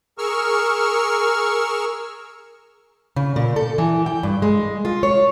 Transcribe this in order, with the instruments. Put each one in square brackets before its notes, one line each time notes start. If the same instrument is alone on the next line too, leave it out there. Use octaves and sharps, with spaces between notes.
[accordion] G#4 A#4 C#6 E6 F6
[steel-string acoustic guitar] C#3
A#2
A4
E3
G5
G2
G#3
F4
C#5